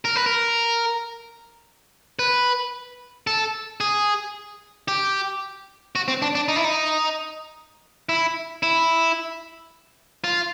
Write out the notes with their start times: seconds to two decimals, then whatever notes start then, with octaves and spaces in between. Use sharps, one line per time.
0.05 A#4
0.16 B4
0.26 A#4
2.19 B4
3.27 A4
3.81 G#4
4.88 G4
5.96 F#4
6.08 C4
6.22 D4
6.35 D4
6.48 D#4
6.56 E4
6.65 D#4
8.09 E4
8.63 E4
10.24 F4